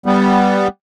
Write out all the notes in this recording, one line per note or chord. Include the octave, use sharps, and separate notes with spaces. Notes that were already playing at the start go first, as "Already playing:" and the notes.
G3 B3